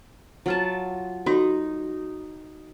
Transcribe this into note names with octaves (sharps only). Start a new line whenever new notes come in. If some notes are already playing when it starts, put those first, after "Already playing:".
F#3 F4 A5
D#4 F#4 A4 C6